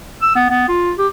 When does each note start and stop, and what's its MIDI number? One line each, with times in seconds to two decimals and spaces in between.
0.22 0.32 88
0.36 0.46 59
0.50 0.67 59
0.68 0.91 65
0.98 1.07 67